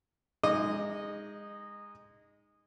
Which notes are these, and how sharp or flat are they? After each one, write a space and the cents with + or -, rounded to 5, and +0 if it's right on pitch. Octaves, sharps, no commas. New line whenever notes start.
G#3 -20 D#4 +0 D#5 -15